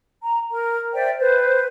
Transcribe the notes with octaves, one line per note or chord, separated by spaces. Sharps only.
A#5
A#4
C5 D5 E5 G5
B4 C5